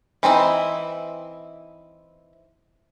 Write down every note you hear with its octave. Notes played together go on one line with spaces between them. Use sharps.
E3 C4 D#4 E4